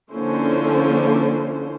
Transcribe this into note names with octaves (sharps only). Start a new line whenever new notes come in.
D3 F3 A#3 C#4 E4 C5